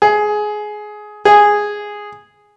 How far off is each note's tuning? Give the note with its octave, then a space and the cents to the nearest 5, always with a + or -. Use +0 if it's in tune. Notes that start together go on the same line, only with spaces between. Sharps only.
G#4 +15
G#4 -5